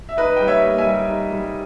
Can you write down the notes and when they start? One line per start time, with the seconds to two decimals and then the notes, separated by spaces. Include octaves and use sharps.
0.09 E5
0.17 D#4 B4 D#5
0.36 G3 G5
0.47 C#5 E5
0.63 A#3
0.78 E5 G#5
0.86 G3
1.09 D#4
1.31 G3